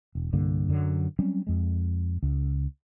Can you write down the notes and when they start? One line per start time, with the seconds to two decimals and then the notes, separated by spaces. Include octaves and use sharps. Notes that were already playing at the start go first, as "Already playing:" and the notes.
0.15 E1
0.33 C2 G2 D3 A#3
0.69 F#2 D3 F3 F#3
1.19 F#3 G3 C4 C#4
1.47 F2 G#3
2.23 C#2